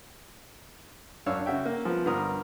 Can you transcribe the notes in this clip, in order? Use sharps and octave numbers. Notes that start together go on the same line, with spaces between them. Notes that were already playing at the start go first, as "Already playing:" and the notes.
F#2 D4 C#5 F5 E6
C#3 F#4 E5 G5
A#3
F3 B3
G2 D3 A#4 A#5 D#6